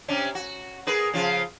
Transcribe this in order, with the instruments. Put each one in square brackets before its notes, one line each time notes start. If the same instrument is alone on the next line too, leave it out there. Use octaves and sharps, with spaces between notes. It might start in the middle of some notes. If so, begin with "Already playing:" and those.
[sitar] C3 C#4 D4
F#4
G#4 A#4 B4
C#3 F3 F4